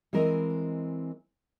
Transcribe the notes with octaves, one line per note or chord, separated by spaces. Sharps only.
E3 G#3 C4 A#4 D#5